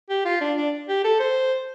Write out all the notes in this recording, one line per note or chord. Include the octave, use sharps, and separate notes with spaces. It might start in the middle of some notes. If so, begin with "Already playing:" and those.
G4
F4
D4
D4
G4
A4
C5